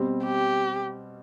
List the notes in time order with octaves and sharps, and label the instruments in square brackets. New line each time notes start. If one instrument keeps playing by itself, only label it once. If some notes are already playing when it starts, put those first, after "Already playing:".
Already playing: [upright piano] B2 G3 C4
[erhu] G4